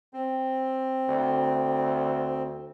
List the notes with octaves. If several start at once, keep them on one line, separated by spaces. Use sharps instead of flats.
C4
D2